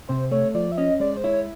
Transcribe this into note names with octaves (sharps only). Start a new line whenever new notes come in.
C3 C5
A3 C#5
F3 D5
E5
C#4 D#5
G#3 D5
C5
E4 C#5